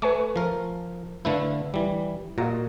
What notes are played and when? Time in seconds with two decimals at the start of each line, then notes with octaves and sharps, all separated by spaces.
0.02 A3 B4 G#5 C#6
0.36 F3 A#4
1.25 D3 A3 E4 B4 F5
1.74 E3 G3
2.38 A#2 F4 F#4 D#5 A#5